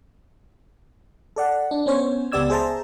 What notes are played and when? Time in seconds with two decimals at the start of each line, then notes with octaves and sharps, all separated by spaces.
1.36 A4 D5 F#5
1.71 D4
1.86 B3 C#4 C5 C#5
2.32 C#2 B3 G4 D5 E6 G#6
2.50 G#4 C5 E5 A5 A#5